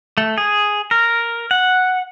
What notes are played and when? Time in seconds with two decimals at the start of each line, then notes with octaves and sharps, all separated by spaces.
0.18 A3
0.38 G#4
0.91 A#4
1.51 F#5